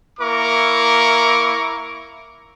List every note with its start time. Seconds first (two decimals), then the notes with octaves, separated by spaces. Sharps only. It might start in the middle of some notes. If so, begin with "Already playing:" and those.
0.19 A#3 E4 A#4 C#6 D6